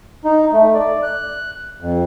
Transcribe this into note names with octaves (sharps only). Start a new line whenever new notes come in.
D#4
A3
D5
F#6
F2